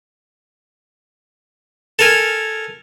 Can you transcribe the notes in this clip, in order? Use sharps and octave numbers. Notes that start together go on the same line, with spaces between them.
A4 A#4 G#5